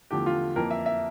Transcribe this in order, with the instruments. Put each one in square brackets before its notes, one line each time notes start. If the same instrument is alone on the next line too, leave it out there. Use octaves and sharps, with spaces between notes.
[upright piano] E2 D3 F3 A3 G4
F4
F2 E3 A#3 A#4
E5
E5